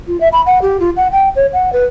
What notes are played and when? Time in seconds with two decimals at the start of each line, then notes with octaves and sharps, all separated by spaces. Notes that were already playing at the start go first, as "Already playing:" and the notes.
0.08 F4
0.21 E5
0.33 B5
0.46 F#5
0.62 G4
0.80 F4
0.96 F#5
1.12 G5
1.36 C#5
1.53 F#5
1.73 B4